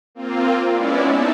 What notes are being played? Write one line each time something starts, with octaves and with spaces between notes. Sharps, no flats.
A#3 C4 F4
G#3 B3 C#4 E4 D5
D#4 E5 A5